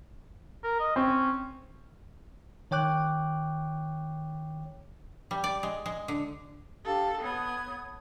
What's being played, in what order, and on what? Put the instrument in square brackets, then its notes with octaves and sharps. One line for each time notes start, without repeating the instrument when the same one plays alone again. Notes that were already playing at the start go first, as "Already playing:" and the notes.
[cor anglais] A#4
D#5
[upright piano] C4 [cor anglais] C#4
[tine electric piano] D#3 C#5 G5 D6 F#6
[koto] G3
D5
G#3
G#3
D3
[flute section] D4 G4 F5 [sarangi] A4
[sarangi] B3 [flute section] C#5 D#6 G#6